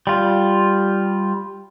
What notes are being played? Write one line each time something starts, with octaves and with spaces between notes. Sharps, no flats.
G3 F4